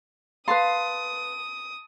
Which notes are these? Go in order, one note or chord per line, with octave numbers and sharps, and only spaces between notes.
B4 F5 A5 C6 D#6